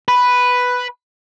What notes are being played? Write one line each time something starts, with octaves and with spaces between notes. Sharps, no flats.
B4